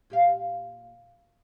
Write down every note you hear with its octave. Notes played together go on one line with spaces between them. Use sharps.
A#2 G4 F5